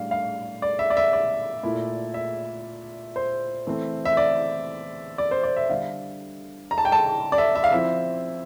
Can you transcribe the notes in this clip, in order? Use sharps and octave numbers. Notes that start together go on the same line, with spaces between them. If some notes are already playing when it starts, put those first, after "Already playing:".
Already playing: A2 G3 D4 F5
F5
D5
E5
D5
E5
D5
A#2 A3 E4
E5
C5
E3 A3 C4
E5
D5
D5
C5
D5
E5
D3 G3 D4 F5
A#5
A5
G5
A5
D5
E5
E5
F5
F3 C4 E4 E5